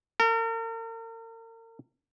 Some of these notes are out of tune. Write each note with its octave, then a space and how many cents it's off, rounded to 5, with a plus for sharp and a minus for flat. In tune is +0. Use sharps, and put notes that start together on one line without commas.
A#4 -40